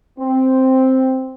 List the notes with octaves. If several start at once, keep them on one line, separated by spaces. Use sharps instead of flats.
C4